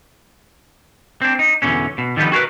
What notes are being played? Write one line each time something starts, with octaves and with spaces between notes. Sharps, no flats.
C4 D4
D#4
E2 G2 B2 D3 C#4
B2
D3 D#3 F3 G3 B3
F#4 G#4 A#4 B4